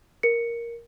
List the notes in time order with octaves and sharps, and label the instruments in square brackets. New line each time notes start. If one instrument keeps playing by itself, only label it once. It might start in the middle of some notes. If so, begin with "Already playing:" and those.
[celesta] A#4 C#7